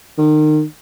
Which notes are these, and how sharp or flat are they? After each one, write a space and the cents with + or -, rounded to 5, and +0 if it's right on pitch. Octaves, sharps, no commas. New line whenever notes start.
D#3 -30